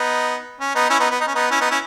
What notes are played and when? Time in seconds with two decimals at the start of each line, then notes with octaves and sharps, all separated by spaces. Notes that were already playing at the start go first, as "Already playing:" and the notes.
Already playing: B3 D#4
0.60 C#4
0.75 B3 D#4
0.90 C#4 E4
1.00 B3 D#4
1.11 B3
1.20 D#4
1.27 C#4
1.35 B3 D#4
1.51 C#4 E4
1.60 B3 D#4
1.71 C#4 E4